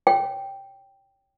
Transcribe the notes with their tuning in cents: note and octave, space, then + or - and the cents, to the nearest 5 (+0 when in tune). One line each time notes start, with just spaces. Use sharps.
C#5 +10 G5 +0